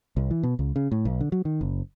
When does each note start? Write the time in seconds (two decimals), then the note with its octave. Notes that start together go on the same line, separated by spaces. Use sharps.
0.17 C2
0.31 E3
0.43 B2
0.59 C#2
0.76 C#3
0.92 A2
1.05 B1
1.21 D3
1.32 F#3
1.45 D#3
1.61 F#1